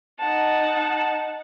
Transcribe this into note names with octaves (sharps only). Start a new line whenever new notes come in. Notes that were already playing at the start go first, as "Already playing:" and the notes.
D#4 F#5 A5